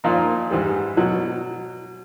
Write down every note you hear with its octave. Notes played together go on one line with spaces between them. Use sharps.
A#2 F3 A#3 D#4
G#2 E3 G3
B2 F#3